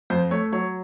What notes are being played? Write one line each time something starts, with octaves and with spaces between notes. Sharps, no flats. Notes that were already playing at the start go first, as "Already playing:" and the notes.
F2 C5
A3 C#5
F#3 C#5